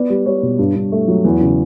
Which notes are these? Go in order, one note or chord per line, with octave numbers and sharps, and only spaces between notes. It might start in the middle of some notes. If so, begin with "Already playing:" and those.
Already playing: B3 D5
G3
G3 C#5
B2
G2
G2
A3
F#3
E2
C#3